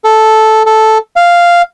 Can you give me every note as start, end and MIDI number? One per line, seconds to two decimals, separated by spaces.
0.04 0.63 69
0.66 0.98 69
1.16 1.62 77